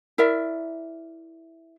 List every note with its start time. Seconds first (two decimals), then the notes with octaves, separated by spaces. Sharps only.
0.18 E4 A#4 D5 E5